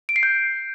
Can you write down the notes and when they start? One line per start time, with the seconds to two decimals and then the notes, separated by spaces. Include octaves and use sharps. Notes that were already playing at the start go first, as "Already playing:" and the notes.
0.09 D7
0.16 C7
0.23 G6